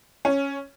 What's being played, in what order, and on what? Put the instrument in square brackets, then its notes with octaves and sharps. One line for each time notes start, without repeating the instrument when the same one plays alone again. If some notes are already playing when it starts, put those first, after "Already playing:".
[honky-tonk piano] C#4